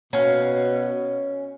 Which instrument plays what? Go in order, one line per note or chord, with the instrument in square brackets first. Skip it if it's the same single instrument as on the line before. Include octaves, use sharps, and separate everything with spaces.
[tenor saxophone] B2 [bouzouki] C#4 F5